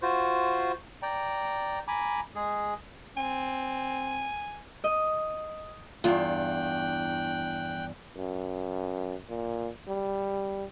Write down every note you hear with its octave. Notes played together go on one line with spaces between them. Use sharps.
F4 F#4 C5
D5 G5 A#5
G#5 A#5 B5 D6
G#3 G#4
C4 G#5
D#5
E2 G2 F4 G5 F#6
F#2
A#2
G3